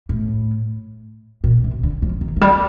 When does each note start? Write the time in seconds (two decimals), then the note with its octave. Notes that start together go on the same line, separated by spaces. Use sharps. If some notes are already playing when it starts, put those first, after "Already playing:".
0.09 A2
1.44 A#2
1.64 C3
1.83 D3
2.02 F3
2.21 D#3
2.36 F3
2.41 G3